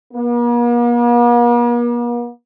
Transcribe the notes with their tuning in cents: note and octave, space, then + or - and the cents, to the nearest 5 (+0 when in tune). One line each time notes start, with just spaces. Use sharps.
A#3 +45